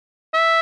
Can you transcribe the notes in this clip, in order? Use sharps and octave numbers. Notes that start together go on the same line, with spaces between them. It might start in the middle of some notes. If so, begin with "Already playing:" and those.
E5